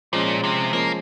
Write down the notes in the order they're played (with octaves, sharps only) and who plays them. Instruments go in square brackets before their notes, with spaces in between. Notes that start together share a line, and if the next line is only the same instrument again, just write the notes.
[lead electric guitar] A#2 [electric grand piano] F3 G#3 C#4
[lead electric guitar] C3
[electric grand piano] F3 G#3 C#4 [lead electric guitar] A#3